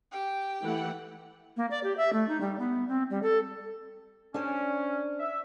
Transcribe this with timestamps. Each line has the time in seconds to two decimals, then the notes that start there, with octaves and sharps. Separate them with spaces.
0.12 G4 G5
0.62 E3 A3 F#5
1.56 A#3
1.70 D5
1.83 G4
1.97 E5
2.12 A3
2.28 D#4
2.40 G3
2.58 B3
2.88 C4
3.10 G3
3.22 A4
4.34 C#4 D4 C5 D5
5.19 E5